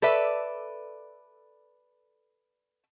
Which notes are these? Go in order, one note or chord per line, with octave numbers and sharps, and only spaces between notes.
A4 B4 D5 E5